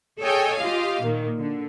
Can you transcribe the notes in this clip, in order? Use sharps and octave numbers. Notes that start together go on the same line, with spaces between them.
G#4 A4 C#5 D#5 G5 G#5
F4 G4 D#5 F5
A#2 D#3 A#3
D3